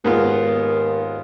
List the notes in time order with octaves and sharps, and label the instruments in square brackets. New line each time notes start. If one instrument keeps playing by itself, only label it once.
[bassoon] D#2 [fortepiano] G#2 B3 F4